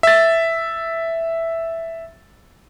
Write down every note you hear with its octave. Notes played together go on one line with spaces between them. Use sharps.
E5 A6